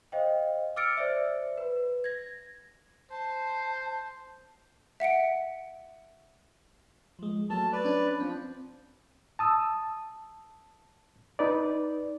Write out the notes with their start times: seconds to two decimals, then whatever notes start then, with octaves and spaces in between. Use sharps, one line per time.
0.12 C5 D#5 F5 G5
0.76 D6 E6 F6 A6 C#7 D7
0.97 C5 D5 E5
1.58 B4
2.04 G#6 A#6
3.11 C5 A5
5.00 E5 F#5 C#7 D7
7.19 F3 G#3
7.50 F#3 A3 A#3 A5
7.72 B4 D5
7.84 C#4 D4
8.20 F3 C4
9.39 A5 D#6 E6
11.39 D#4 B4 D5